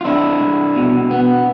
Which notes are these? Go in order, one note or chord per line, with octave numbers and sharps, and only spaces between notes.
F4
C2 D4 E4
C2
B2
B3